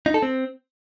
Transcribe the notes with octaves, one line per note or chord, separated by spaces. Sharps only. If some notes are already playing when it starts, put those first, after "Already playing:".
D#4
A4
C4